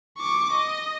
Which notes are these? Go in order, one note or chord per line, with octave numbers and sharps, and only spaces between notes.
C#6 D6
D#5